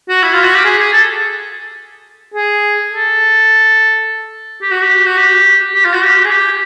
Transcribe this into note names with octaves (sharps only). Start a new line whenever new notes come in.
F#4
E4
F4
F#4
G4
G#4
G#4
A4
G#4
A4
G4
F#4
G4
F#4
G4
G4
F4
F#4
G4
G#4
G4